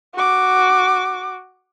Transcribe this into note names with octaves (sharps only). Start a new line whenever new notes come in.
F#4 D6